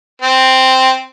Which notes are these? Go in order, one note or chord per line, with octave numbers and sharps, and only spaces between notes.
C4